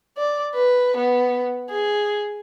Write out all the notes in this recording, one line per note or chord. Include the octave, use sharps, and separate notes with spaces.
D5
B4
B3
G#4